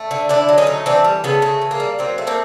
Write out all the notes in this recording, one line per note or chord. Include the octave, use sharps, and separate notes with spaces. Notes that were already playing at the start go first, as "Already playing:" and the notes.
Already playing: A3
D3
D3 D4 E4
F#3
C#4 D#4
A3
E3 C4 D4
G3
C#3 A3 B3
C#3 A3
E3
A#3
G3
F#3 A#3 C4
A3
A#3 C4